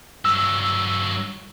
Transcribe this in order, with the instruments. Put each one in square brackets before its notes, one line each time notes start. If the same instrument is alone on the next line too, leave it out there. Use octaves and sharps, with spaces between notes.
[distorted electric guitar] G2 F#3 [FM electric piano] E6